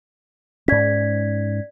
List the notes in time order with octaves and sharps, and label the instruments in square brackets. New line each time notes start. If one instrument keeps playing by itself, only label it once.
[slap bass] G#2 C#4 [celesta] D5 G#6 B6